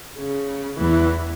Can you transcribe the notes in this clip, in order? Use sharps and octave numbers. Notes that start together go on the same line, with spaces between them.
C#3
E2 E3